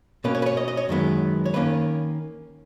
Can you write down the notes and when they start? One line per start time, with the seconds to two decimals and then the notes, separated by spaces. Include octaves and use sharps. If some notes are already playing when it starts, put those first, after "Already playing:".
0.24 B2 A#3 C#4 B4
0.35 C#5
0.42 B4
0.46 C#5
0.57 D#5
0.68 D#5
0.77 C#5
0.89 F#2 D#3 G#3 B3
1.46 C#5
1.54 D#3 A#3 C#4 B4